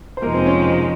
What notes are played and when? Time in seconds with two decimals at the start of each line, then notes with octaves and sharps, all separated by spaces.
0.17 C5
0.22 F2 C3 F3 G#3 A#3 D#4 A#4
0.34 C4 C5
0.46 C#4 C#5